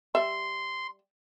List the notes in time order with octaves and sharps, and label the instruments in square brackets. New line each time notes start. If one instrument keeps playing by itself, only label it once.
[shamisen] G3 E5 [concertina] C6